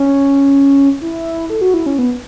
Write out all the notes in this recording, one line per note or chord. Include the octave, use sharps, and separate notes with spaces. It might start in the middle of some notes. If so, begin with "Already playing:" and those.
Already playing: C#4
E4
A4
F#4
E4
C#4
B3